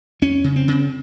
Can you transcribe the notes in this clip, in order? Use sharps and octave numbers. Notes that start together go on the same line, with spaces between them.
F2 C#4
C#3
C4
C#3